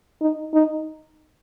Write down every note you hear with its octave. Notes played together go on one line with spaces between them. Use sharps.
D#4
D#4